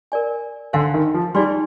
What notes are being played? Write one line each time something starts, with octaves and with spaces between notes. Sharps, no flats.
A#4 D5 G#5
D3 C5 F5 G#5 C6
D#3
F3
G3 D#4 G#4 D5 G#5 C6